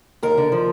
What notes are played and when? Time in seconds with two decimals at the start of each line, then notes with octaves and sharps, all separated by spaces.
0.23 D#2 A#4
0.38 D3
0.52 F3